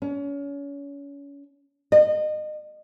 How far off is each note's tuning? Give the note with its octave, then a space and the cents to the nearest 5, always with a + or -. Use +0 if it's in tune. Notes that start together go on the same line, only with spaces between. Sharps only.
C#4 +30
D#5 -30